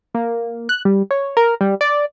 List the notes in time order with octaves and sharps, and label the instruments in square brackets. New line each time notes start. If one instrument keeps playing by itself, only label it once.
[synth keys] A#3
F#6
G3
C#5
A#4
G3
D5